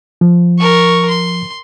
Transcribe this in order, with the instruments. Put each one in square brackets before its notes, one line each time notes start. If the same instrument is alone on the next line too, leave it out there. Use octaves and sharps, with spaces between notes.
[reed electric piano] F3
[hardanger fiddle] A#4 C#6
C6